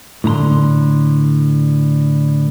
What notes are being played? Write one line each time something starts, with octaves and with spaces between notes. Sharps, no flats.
A2 D3 A#5 C6